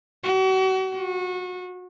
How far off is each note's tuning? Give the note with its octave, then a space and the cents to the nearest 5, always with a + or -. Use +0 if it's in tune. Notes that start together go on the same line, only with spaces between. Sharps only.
F#4 +40
F#4 -30